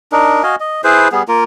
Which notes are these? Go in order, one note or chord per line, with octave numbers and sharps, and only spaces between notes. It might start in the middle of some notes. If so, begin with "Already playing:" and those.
D4 D#4 A#4
F#4 D#5 F5 G#5
D#5
E4 G#4 B4 C5
G3 B3 G#4
A#3 F4 A#4